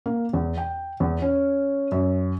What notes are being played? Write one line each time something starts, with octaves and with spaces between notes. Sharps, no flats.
A#3
E2
G5
E2
C#4
F#2